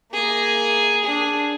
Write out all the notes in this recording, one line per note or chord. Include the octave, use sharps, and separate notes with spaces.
A#3 G#4
D4 G#4